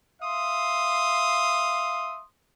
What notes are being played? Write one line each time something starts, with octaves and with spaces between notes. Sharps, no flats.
E5 F5 C6 D#6